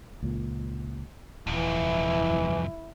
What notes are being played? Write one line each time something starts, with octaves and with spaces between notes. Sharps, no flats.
C#2 A#2
D#1 C2 F2 E3 E4